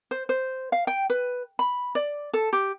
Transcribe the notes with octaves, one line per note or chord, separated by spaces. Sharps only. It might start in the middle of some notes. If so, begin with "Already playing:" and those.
C5
C5
F5
G5
B4
B5
D5
A4
G4